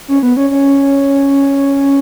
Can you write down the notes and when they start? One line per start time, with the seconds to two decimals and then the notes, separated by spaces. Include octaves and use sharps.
0.08 C#4
0.23 B3
0.37 C#4
0.51 C#4